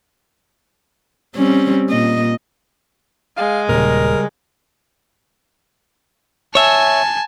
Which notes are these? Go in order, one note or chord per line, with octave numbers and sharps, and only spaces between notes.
G3 C4 C#4
A#2 D#5
G#3 F5
D#1 A#2 C#3 G3 A#4
C#5 E5 G#5 A5